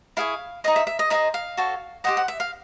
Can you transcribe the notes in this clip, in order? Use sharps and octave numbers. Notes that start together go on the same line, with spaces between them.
E4 G#4 C#5 F5
D#4 G#4 C5 D#5
E5
E5
D#5
D#4 G#4 C5 D#5 E5
F5
F#4 A4 C#5
G4 C5 D#5 F#5
F#5
E5
F5